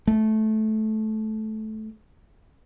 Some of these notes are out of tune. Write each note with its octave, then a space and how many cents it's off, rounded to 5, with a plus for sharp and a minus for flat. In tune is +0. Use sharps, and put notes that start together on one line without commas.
A3 -15